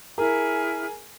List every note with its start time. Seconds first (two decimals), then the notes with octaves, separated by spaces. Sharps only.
0.18 E4 G#4 A#4 F6